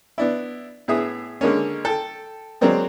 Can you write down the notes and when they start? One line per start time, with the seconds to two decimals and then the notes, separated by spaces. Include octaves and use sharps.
0.18 B3 D4 E4
0.88 A2 B3 G#4 E5 D#6
1.41 D3 G#3 A#3 C#4
1.85 A4 G5
2.61 F#3 G#3 A#3 C4 D4